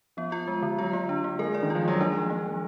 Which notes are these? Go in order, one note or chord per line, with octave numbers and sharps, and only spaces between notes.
F3 B3
F4
G#3
D3
F#3 F4
A#3
D4
A#3
G#3 A#4
D5
D#3
F3 F4
F#3 A#3
G#3 D4
F3
A#3
F3